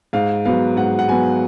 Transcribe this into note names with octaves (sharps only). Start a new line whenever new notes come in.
G#2 F5
F#3 B3 F5
G#2 F#5
F#5
F#3 B3 G#5